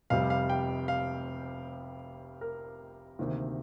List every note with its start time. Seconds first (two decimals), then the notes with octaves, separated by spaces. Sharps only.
0.10 F1 F2 C3 G3 F5
0.30 F5
0.50 G5
0.88 F5
2.41 A#4
3.19 D2 C3 D#3 A#3